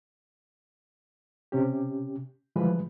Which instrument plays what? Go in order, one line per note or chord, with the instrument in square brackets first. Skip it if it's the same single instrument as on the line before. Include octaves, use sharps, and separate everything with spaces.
[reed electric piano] C3 C#4 G4
D3 E3 F3 G3 G#3 B4